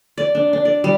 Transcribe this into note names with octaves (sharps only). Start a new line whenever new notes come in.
D5
D4
D4
D5
G3